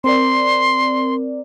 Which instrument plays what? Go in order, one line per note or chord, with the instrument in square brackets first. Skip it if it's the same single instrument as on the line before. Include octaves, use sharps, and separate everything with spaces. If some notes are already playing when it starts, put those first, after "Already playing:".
[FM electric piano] C4 A#4 D5 [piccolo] C6